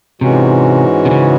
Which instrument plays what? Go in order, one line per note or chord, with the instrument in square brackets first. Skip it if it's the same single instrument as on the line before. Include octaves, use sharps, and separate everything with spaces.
[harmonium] G#2 E3 G#3 C#4 F#4 [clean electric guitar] C3
[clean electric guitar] C3
C#3